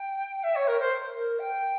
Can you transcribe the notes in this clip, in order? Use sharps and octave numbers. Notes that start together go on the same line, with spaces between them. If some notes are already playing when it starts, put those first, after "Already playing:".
Already playing: G5
E5
C#5
A#4
C5
A#4
G5